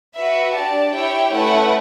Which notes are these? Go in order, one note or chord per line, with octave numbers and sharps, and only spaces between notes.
F#4 B4 E5
D4 G4 D5 A5
E4 G4 C#5 E5 G5
A3 C#4 E4 B4 F#5